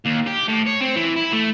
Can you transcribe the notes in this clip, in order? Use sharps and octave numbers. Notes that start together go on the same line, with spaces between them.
D#2
G4
A2
C#5
C4
E3
E4
A3